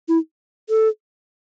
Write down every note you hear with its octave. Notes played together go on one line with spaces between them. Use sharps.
E4
A4